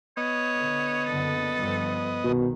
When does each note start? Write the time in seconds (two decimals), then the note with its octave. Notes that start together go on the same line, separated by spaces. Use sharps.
0.17 B3 C#5 D#5
0.57 D3
1.06 F#1 D3 A4
1.55 G2 D3 F3
2.24 C2 B2 D#3